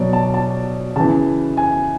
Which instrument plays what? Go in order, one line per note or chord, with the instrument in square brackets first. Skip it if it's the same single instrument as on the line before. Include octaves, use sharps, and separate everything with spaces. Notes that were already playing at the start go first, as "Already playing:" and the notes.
Already playing: [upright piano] B2 F#3 C#5 D5
A5
A5
C#3 E3 A5
G#5